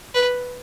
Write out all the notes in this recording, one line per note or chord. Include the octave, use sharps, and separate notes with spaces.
B4